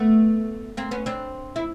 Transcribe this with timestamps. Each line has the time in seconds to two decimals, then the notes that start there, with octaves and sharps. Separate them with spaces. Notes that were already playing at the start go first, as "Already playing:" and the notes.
Already playing: A3 B3
0.77 A#3 C4
0.91 B3 C#4
1.06 C4 D4
1.56 E4